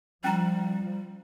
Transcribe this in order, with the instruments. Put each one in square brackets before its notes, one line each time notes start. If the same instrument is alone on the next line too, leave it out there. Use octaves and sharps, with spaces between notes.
[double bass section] F3 [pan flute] G3 [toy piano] C#4 E4 A#5